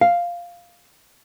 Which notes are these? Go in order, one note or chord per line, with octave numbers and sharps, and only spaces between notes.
F5